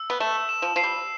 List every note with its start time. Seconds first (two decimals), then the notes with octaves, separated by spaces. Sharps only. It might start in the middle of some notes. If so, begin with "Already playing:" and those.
Already playing: E6
0.10 B3
0.20 A3 E7
0.49 E7
0.62 F3
0.76 F3 C7
0.83 G3